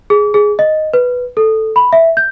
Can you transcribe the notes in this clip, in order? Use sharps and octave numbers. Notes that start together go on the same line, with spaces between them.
G#4
G#4
D#5
B4
A4
B5
E5
G6